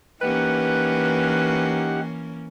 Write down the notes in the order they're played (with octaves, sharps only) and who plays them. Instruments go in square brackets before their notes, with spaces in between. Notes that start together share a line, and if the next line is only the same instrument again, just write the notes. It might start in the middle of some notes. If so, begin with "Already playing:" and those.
[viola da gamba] E3 A#3 C#4 [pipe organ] D#4 G4 F#5 [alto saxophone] B4